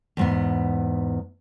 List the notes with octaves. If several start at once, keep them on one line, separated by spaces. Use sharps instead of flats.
E2 G#2 B3